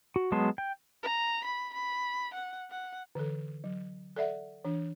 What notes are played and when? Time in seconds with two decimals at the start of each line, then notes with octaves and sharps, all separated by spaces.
0.16 F#4
0.32 F#3 G#3 B3 A5 C6
0.58 G5
1.03 A#5
1.45 B5
1.74 B5
2.34 F#5
2.71 F#5
3.15 D3 E3 A4
3.64 F#3
4.16 A4 D5 E5 F#5
4.65 E3 D4